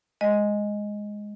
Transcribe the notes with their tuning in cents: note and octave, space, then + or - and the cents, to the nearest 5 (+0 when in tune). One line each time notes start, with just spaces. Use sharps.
G#3 +0 D#5 +0